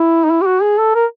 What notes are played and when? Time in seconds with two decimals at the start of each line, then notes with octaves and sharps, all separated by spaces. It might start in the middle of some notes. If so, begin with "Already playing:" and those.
Already playing: E4
0.24 D#4
0.30 E4
0.42 G4
0.46 F#4
0.62 G#4
0.78 A4
0.95 A#4